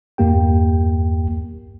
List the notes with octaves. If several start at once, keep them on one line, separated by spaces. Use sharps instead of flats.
E2 G2 A#3 G4 G5